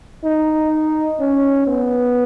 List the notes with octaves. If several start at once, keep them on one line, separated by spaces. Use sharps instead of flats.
D#4
C#4
B3